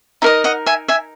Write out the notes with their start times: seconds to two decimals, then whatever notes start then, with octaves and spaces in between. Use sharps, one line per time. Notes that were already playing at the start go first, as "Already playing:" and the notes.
0.22 D#4 A#4 D#5 E5
0.44 D#5 F#5
0.66 E5 G#5
0.88 E5 G#5